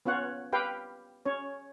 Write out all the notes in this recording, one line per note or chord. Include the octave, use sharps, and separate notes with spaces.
B3 C#4 F4 C#5 F#5
G4 B4 F5 G5
C#4 C#5